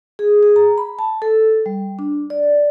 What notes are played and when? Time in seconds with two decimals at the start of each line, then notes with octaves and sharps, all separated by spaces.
0.19 G#4
0.43 G#4
0.56 A#5
0.78 B5
0.99 A5
1.22 A4
1.66 G3
1.99 D4
2.30 D5